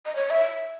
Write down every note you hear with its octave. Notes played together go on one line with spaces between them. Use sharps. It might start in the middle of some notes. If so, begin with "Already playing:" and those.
D#5
C#5
E5